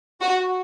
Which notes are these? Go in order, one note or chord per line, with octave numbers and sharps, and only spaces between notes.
F#4